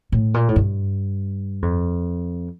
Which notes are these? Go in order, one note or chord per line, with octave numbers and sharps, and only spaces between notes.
A2
A#2
A2
G2
F2